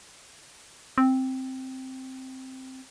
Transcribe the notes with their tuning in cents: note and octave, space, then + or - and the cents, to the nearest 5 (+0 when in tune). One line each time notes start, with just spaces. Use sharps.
C4 +0